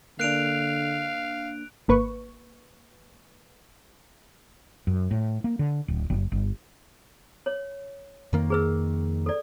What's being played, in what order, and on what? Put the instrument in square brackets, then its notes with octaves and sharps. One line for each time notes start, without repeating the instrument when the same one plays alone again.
[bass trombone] D3 [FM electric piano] A#3 D4 [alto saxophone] F5 [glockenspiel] F#6 D7 F7
[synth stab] G#1 A#3 B4 C#6
[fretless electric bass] F#2
A2
A#3
D3
D1
F#1
G1
[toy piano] C#5
[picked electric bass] F2 D#3 A#3
[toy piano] G#4 B4 E6
A4 D5